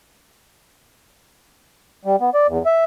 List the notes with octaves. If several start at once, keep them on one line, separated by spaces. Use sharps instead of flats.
G3
B3
D5
E2
E5